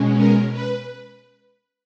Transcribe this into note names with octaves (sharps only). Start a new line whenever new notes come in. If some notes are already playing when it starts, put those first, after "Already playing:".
Already playing: B2 G#3 C#4
A#4
B4